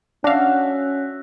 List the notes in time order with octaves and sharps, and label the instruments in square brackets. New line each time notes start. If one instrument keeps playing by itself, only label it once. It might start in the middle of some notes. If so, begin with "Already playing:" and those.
[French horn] C#4 [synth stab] D4 F5 [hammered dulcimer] F#4 E5